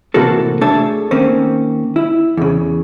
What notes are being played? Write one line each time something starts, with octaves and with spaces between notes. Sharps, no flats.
A2 C3 E3 A#3 F#4 A4
A3 D4 G#4 A4 C#5 A5
D#3 A#3 C4 C#4
E4
E2 C#3